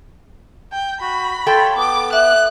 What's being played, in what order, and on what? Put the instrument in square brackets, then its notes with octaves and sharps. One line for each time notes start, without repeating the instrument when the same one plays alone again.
[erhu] G5
[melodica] F#4 [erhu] B5
[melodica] F4 C#5 [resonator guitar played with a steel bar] A4 G5
[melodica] B3 [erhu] D6
[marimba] E5 [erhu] F#6